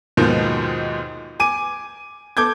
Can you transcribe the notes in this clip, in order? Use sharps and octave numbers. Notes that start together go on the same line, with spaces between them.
D#2 G#2 B2 D#3 F3 B3
G#5 D6 D#7
A4 D6 G6 G#6